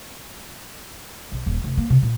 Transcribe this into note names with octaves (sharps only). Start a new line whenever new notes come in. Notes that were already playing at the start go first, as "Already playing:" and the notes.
B1
D#1
F1
A#3
C3
A#2